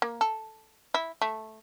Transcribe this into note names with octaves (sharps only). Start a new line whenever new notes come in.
A#3
A4
E4
A3